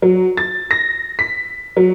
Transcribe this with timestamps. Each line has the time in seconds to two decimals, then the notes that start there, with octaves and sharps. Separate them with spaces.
0.02 F#3
0.37 A6
0.71 A#6
1.19 B6
1.77 F#3